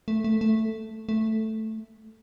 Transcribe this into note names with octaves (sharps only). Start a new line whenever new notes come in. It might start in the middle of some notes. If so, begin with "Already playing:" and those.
A3
A3
A3
A3